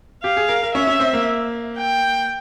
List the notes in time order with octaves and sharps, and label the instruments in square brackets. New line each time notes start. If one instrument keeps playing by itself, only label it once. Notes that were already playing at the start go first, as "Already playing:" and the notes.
[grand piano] G4 [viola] F5
[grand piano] G#4
A#4
A#4
[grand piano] C#4 [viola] E5
[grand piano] C#4
C4
A#3
[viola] G5